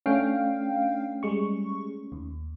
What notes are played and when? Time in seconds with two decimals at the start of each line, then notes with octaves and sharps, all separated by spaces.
0.06 A3 C#4 D4 F5 G5
1.23 G3 G#3 C#6
2.12 D#2